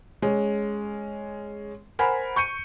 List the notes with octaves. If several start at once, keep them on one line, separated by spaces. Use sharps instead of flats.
G#3 C#4
A#4 C5 F#5 G#5 B5
C#6 G6 C#7 D#7